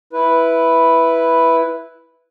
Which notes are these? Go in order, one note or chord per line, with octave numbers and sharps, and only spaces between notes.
E4 B4